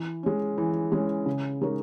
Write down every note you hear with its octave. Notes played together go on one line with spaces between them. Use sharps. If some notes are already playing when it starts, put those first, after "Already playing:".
Already playing: E3
G#3 C#4
E3
G#3 C#4
C#3
G#3 D#4 A#4 C#5